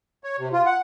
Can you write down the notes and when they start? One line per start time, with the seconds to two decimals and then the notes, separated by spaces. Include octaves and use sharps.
0.24 C#5
0.39 C3
0.53 F4
0.66 F#5